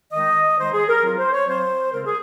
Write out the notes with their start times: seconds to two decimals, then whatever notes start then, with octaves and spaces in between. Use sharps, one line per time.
0.13 D#3 G#3 D#4 D#5
0.58 D#3 G#3 D#4 C5
0.73 G#4
0.88 A#4
1.03 F#3 C4 F4
1.18 C5
1.33 C#5
1.47 F#3 C4 F4 C5
1.93 C#3 G#3 C4 F4 A#4
2.05 G#4